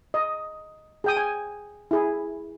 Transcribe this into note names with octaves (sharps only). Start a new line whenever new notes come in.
D#5
G#4 G5 D#6
G#5
E4 G#4